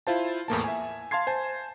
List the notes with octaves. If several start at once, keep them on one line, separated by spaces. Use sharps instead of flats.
E4 F4 C5 A5
E2 A2 A#3 A5
E5 G#5
F5 A5 C6 G#6 C7
C5 G#5 A5